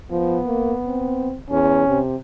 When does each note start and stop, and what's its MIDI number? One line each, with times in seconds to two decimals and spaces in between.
0.11 0.39 53
0.11 1.31 59
0.46 0.73 58
0.86 1.37 60
1.50 1.84 40
1.50 2.00 61
1.88 2.16 48